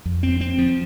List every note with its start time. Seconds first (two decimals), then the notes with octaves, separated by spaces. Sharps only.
0.06 F2
0.23 C4
0.41 C4
0.58 F3